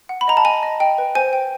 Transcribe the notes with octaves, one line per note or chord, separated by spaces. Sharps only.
F#5
B5
D#5 A#5
A5
D#5 G#5
D#5
D#5 G5
B4
C5 G#5
G5